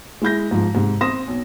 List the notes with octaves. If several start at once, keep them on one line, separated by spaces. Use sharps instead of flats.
G#3 E4 G6 A#6
G#2 F3
G#2 C3
C4 C6 D#6 A#6 E7
B1